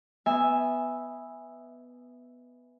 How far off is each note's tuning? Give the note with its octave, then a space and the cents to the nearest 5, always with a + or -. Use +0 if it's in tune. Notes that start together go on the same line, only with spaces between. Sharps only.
B3 +0 E5 +0 G#5 -10